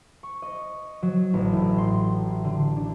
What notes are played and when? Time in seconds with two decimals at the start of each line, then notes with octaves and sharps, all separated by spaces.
0.23 C#6
0.42 D#5
1.02 F#3
1.34 A1
1.53 A2
1.78 C6
2.44 D3
2.76 D4